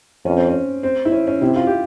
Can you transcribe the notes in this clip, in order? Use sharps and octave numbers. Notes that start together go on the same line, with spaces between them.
F2 C#4
C4
C#4
C4
E4
C#4
C#4
C3 E4
F4
G4